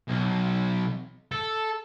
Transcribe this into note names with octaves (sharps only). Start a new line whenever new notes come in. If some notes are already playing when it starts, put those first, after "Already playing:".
B1
A4